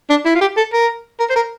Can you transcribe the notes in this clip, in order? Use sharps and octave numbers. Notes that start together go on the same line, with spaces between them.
D4
E4
F4
G4
A4
A#4
A#4
C5
A#4